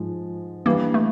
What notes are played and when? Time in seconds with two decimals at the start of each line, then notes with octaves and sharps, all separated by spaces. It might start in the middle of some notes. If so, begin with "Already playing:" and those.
Already playing: G#2 F3 G#3
0.66 E3 G3 A#3 B3 D4
0.94 A3